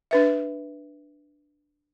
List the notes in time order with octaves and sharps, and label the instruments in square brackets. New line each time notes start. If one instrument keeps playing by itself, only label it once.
[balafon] D4 B4 E5